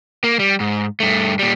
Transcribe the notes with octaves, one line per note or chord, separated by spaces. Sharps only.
A#3
G3
G#2
G2 A3
A#2 G3